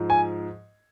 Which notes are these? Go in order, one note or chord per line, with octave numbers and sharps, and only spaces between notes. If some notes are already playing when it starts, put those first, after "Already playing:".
Already playing: G#2 F3
G#5